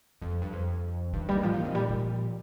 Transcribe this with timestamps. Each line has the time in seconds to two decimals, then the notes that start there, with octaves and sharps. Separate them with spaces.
0.21 F2 F3
0.42 G2
0.53 F2
1.13 G2 D#3
1.29 G3
1.37 D#3
1.43 G#2 F3
1.53 A#2
1.60 D#3
1.65 C3
1.74 A#2 G3
1.89 F3